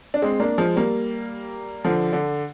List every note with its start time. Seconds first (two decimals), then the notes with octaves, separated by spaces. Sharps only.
0.14 D4
0.22 G#3 C4
0.40 A#3 D4
0.58 F3 G#3
0.76 G3 A#3
1.85 D3 F3
2.13 D3